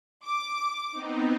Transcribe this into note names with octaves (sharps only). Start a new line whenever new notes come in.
D6
B3 C4 D#4